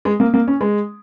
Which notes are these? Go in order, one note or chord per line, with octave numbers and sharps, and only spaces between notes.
G#3
A#3
A#3
C#4
G#3